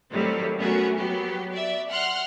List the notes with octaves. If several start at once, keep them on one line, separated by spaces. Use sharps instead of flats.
A2 D#3 F#3 G3 A3 C4
A3 B3 C#4 F#4 G#4 A#4
F#3 B3 F#4 G4
D5 E5
F#5 C6 F6 F#6